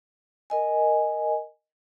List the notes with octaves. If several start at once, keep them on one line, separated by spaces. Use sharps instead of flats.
A#4 D#5 G#5